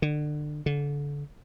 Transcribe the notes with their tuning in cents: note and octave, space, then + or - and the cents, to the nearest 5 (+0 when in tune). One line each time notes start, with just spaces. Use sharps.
D3 +30
D3 -30